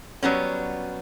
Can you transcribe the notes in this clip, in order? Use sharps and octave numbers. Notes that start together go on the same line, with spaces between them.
F#3 G3 B3 C#4